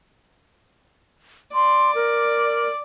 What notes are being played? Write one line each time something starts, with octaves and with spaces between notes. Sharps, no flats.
D5 C6
A#4